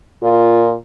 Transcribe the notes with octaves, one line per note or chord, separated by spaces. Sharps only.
A#2 F4